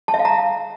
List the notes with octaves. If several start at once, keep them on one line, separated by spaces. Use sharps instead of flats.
A5
E5
F5
A#5